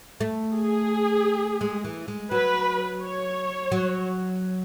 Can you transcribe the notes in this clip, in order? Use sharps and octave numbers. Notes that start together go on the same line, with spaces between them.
A3
G#4
G#3
E3
G#3
F#3 B4
C#5
F#3